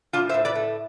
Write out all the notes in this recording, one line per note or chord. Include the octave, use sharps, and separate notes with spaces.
A2 D4 F4
C5 E5
A2
B4 D5
A3